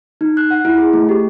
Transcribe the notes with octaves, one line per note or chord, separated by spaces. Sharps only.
D#4
F#6
F#5
E4
G#4
A3
G4